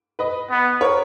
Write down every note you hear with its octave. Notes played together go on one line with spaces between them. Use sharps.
B4 D#5
B3
A#4 C#5